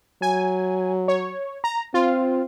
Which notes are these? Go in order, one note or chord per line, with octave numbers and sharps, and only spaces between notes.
F#3 G#5
C#5
A#5
C4 F4